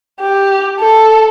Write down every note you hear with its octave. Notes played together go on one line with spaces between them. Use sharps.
G4
A4